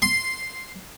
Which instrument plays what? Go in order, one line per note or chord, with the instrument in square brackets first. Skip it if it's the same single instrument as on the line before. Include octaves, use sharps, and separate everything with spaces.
[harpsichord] C6